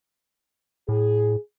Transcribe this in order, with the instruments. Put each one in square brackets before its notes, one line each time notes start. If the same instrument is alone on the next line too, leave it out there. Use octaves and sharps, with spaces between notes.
[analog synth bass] A2 [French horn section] G#4